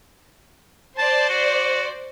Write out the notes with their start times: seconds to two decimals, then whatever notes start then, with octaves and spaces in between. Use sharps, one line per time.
0.98 C5 D5 A5
1.29 F#4